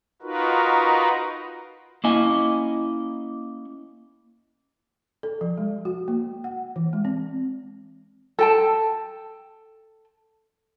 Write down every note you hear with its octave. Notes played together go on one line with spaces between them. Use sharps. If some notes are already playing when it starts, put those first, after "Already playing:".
D#4 F4 F#4 A#4 B4
A#3 C#4 E4 D#5 G#5
A4
F3
G#3
F#4
A#3
F#5
E3
G#3
C4
A4 G5 A5